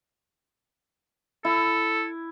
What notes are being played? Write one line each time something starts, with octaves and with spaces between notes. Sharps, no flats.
E4 A4